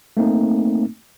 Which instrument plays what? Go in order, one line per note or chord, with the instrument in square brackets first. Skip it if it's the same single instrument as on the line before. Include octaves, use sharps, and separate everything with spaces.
[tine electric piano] A3 A#3 C4 D#4